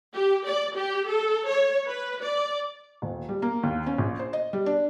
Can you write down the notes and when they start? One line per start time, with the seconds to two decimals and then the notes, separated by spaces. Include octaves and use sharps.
0.13 G4
0.46 D5
0.74 G4
1.07 A4
1.47 C#5
1.87 B4
2.23 D5
3.02 D#1
3.29 G3
3.42 A#3
3.63 D#2
3.86 C#4
3.98 A#1
4.19 C5
4.33 D#5
4.53 G3
4.66 D4